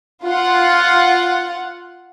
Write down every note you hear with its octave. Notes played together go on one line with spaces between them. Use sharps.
F4 F#5